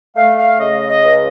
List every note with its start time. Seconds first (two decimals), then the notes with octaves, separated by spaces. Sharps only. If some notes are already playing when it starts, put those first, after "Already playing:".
0.16 A3 F5
0.38 F5
0.59 C#3 D#5
0.88 D#5
1.04 C#2